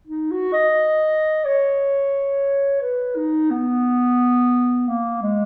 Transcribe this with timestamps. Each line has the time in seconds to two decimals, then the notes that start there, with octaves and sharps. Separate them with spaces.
0.07 D#4
0.31 F#4
0.53 D#5
1.45 C#5
2.82 B4
3.16 D#4
3.51 B3
4.88 A#3
5.22 G#3